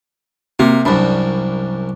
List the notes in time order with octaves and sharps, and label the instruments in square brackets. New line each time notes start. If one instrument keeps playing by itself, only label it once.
[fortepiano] C3 [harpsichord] A#3
[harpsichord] C2 F#2 [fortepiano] D4 B5